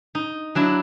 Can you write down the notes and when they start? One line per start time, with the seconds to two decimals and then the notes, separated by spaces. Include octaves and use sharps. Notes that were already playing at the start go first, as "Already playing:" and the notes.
0.15 D#4
0.55 F#3 D4 E4